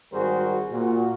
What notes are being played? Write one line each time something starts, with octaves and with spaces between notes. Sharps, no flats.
G#1 G3 F#4 G#4 A#4 C5
A#2 F#4